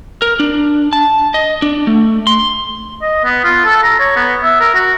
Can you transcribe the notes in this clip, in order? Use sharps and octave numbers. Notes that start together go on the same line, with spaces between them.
A#4
D4
A5
D#5
D4
A3
C6
D#5
B3
F4
A4
A#5
C#5
B3
E5
A#4
F#4